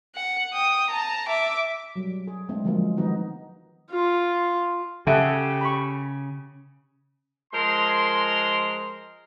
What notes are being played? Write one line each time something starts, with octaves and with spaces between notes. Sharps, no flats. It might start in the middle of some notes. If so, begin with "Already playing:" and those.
F#5
G5 D#6
A5 A#5
E5 D6
F#3 G3
G#4
G#3 A3 C4 D4
D3 F3 F#3 G#3 A#3
D#3 F3 F#3 G#3 B3 D#4
F4
C#3 G4 A4 E5 F#5
B5 C#6
F3 G#3 A#4 C6